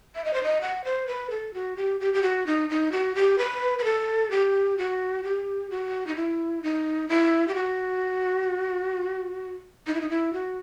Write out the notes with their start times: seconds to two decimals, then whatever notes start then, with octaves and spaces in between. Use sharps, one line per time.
0.15 E5
0.24 D#5
0.34 C5
0.43 D#5
0.61 F#5
0.84 C5
1.07 B4
1.30 A4
1.54 F#4
1.76 G4
2.00 G4
2.14 G4
2.22 F#4
2.47 D#4
2.70 D#4
2.92 F#4
3.15 G4
3.38 B4
3.79 B4
3.84 A4
4.31 G4
4.78 F#4
5.24 G4
5.70 F#4
6.07 D#4
6.16 E4
6.63 D#4
7.09 E4
7.48 G4
7.55 F#4
9.87 D#4
9.94 E4
10.01 D#4
10.09 E4
10.33 F#4